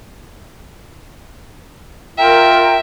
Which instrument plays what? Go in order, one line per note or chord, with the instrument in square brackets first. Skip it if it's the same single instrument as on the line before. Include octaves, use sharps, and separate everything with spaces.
[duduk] F4 [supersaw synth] A#4 [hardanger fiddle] E5 [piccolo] G5